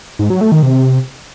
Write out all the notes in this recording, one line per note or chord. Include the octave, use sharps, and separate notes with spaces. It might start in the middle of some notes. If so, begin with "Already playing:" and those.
G#2
F#3
A3
D#3
C3